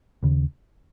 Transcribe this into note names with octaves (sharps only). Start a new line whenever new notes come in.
D#2 C#3